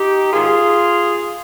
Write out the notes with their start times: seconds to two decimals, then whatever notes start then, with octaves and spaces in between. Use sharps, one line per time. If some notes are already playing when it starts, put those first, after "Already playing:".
Already playing: D#4 G4
0.33 G#2 D#3 F4 G#4